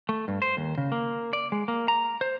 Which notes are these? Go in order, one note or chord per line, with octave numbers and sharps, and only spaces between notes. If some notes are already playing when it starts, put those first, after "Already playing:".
A3
G2
C5
D#2
C#3
A#3
D5
G#3
A#3
A#5
C5